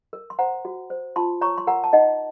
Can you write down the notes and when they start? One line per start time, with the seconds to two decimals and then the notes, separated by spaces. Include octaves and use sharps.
0.13 A#4
0.30 C6
0.39 C5 F#5 A#5
0.65 F#4
0.90 C5
1.16 F4 A5 C6
1.41 C#5 A#5 C#6
1.58 C6
1.67 A#4 F#5 A#5
1.84 A5
1.93 D#4 D#5 F#5